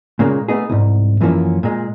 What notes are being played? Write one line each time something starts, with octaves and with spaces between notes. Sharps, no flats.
A#2 C#3 G#3 A#3
A3 B3 D#4 G#4
C2 G#2
F#2 E3 F3 A#3 C#4
A#2 G#3